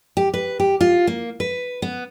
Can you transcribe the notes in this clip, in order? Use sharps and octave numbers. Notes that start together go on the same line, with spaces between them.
G4
B4
G4
F4
A#3
B4
B3